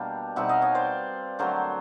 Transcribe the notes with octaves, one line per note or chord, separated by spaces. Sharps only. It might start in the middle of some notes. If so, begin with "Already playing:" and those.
Already playing: B2 G3 A#3 D4 F5 G5
B2 G3 C4 D#4 E5 F#5
D#5 F5
C#5 D#5
C5 D5
D3 F#3 A3 A#4 C5